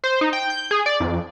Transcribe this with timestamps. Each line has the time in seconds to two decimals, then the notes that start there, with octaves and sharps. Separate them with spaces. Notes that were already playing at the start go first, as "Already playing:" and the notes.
0.04 C5
0.21 D#4
0.33 G5
0.50 G6
0.71 G#4
0.86 D5
1.00 F2